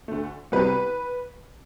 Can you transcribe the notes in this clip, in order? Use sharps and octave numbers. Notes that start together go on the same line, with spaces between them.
D2 D3 A3
C2 C3 G3 B3 B4